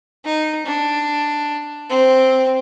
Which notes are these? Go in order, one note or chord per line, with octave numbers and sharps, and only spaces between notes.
D#4
D4
C4